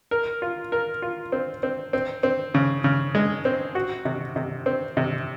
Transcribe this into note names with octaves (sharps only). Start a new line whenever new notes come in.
A#4
F4
A#4
F4
C4
C4
C4
C4
C#3
C#3
G#3
C4
F#4
C3
C3
C4
C3